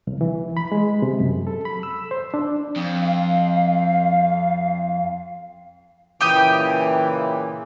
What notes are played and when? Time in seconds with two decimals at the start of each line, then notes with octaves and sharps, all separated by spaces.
0.07 C2
0.21 E3
0.57 B5
0.72 G#3
1.02 C3
1.20 F#2
1.47 A4
1.65 B5
1.83 E6
2.11 C5
2.34 D4
2.76 F2
3.01 F5
6.21 A#2 C#3 E3 G4 G5 D#6